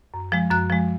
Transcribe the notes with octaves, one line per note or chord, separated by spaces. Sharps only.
F#2
F3 G#3
F#2 F#6
F3 G#3